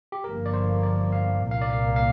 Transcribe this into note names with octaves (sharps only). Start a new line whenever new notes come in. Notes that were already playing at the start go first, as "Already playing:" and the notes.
G4
G1 G2 F3 A#3 A#4
D5
C5
D5
F5
C2 A#2 A#3
F5
D5
F5
F5